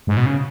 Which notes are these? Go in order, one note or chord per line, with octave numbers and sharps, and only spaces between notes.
G#2
B2
C#3